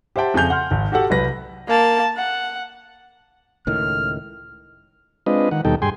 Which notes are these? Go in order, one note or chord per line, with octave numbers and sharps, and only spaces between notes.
G4 C5 E5 F#5 G5 A5
F2 C#3 G#5 G6 F7
F#5 C6 F6
G#1
F#4 G4 A4 F#5
C2 F#3 B4 A#6
A#3 A5
F#5
C#2 A2 D#3 F6
G#3 C4 D4 F4 B4 D#5
D#3 F#5
D#2 B2 G3 D#4 A4 G5
G2 G#4 G5 G#5 C6